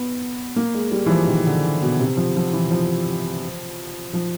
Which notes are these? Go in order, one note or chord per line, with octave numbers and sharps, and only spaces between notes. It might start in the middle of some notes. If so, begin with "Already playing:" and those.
Already playing: B3
A#3
G#3
G3
E3
F3
D#3
D3
B2
C3
F3
F3
E3
F3
F3